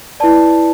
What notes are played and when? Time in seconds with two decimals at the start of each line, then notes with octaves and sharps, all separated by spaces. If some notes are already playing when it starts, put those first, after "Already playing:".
0.20 E4 B4 D5 A5